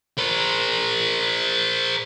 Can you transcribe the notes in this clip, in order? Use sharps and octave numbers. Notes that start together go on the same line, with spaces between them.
A#4 C5